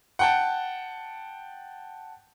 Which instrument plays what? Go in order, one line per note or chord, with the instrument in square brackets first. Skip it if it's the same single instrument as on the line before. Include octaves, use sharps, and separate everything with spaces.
[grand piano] F#5 G5 A5